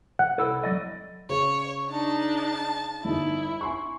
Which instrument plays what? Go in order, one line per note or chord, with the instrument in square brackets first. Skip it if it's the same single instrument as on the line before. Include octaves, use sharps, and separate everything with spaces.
[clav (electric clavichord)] F#5
[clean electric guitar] C2 E4 A4
F#3 D5 D#5
[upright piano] C#3 [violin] C#5
[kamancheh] D4 D#4 [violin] A5
[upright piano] G1 D#4 [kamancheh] E4
[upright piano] G#5 C6 C#6